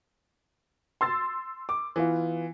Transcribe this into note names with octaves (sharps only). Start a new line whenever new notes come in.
C6 E6 A6
D6
E3 B3 F4